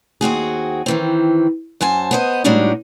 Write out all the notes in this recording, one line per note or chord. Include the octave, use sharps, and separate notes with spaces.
D#2 C4 F#4 G#4
D#3 E3 C4
F#2 C5 G#5 A5
B3 C5 D#5
A2 G3 G#3 D4 D#4 F#4